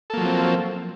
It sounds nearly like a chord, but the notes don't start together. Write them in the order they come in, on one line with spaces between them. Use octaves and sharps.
A4 A#3 F#3 F3 C4